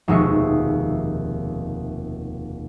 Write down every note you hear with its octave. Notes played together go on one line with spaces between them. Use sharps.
F1 D#2 B2 G#3 E5 C#6